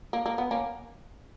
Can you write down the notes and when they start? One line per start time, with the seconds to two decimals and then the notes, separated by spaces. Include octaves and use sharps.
0.13 A#3
0.26 A#3
0.38 B3
0.51 A#3 C#4